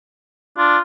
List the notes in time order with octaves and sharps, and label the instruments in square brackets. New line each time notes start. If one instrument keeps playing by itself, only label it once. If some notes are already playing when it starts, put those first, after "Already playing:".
[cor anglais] D4 [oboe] F4